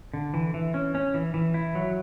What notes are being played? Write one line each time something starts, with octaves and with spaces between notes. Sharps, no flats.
D3
E3
E3
C#4
C#4
E3
E3
E4
F#3